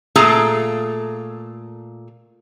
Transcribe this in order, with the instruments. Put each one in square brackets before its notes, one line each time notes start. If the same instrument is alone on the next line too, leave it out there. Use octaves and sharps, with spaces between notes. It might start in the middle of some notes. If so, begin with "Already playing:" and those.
[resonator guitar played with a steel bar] A#2 A3 F4 G#4 A4 A#5